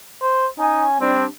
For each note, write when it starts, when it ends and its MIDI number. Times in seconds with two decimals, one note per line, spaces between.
0.22 0.47 72
0.59 1.00 61
0.59 0.84 63
0.59 1.00 80
1.01 1.25 55
1.01 1.25 60
1.01 1.25 62